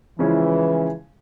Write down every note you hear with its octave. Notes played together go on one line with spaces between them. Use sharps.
C#3 E3 F3 G#3 C#4 E4